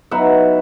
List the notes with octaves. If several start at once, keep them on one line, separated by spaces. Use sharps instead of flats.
F#3 B3 D#4 E5 F#5